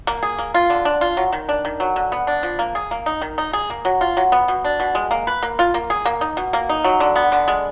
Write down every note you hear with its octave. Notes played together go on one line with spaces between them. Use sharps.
A#3
G#4
A#3
F4
D3
D4
F4
F#3
D#3
D4
D#3
F#3
D3
B3
D4
F3
A#3
G#4
A#3
D#4
D#3
D#4
G#4
A#3
F#3
F4
F#3
B3
B2
D4
B2
G#3
A#3
B4
A#3
F4
A#3
G#4
A#3
D#4
B2
A#3
D#4
F#3
D3
B3
D3
G#3